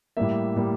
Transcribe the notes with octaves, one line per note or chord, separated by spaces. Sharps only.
A2 G3 A#3 E5
A2 G3 A#3